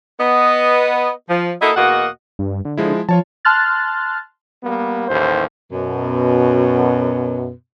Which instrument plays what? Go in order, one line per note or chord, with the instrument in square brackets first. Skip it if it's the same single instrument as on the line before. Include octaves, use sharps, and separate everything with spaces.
[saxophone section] B3 D#5
F3
A#3 E4 F#4 A4 D#5
E2 B2 A#3 F#4 D#5 F#5
[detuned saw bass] G2
D3
[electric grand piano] F3 G#3 E4
[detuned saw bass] F3 [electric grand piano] F4 C#5 A5
[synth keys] A5 C6 F6 F#6 A6
[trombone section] G3 A#3 B3
A1 D#2 A2 C5
[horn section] F#2 B2